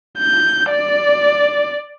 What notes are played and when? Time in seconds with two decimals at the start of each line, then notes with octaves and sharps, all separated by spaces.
0.19 G6
0.70 D5